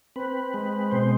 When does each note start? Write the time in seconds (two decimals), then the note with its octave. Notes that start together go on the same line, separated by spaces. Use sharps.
0.16 C4 B4
0.54 G#3
0.91 B2 C5